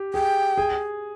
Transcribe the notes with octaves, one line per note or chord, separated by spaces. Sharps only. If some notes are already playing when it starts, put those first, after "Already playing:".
Already playing: G4
G#4 G5
G#4